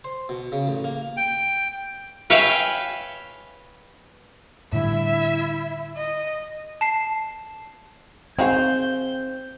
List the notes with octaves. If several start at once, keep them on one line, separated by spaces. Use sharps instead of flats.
C5
B2
C#3
A1
A#3
G5
B4 C#5 E5 F5 G5 G#5
A2 D3 G3 E4 E5
D#5
A5 C7
D#3 C4 G#4 F5 G6